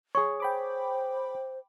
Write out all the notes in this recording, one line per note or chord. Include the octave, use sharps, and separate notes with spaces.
G#4 C#5 C#6
C5 G5 B5 D6